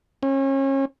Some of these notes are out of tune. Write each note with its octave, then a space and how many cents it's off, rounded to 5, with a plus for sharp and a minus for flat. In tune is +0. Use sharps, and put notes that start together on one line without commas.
C#4 -35